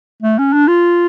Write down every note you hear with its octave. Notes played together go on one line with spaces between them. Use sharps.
A3
C#4
D4
F4